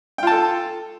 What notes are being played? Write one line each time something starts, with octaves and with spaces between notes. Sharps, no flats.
F4 A4 G5 A5